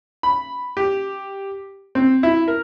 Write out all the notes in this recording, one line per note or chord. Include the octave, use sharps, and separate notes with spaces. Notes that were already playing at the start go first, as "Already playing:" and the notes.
B5
G4
C4
E4
A#4